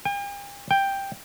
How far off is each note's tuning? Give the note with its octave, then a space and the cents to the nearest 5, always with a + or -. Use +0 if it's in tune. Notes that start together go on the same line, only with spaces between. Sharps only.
G5 +45
G5 +5